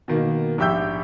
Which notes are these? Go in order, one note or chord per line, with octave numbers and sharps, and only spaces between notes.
B2 D#3 A#3
A#1 G#2 G4 E5 E6 G6